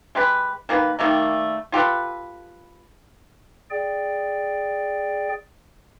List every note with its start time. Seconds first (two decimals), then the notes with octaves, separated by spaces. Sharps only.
0.15 G#3 G4 B4
0.69 D#3 A#3 G4 B4
0.99 D#3 G3 A3 A#3
1.72 F4 G4 A4 B4
3.70 G#4 D5 G5